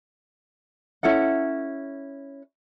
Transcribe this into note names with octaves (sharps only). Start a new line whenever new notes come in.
C#4 E4 A4 F#5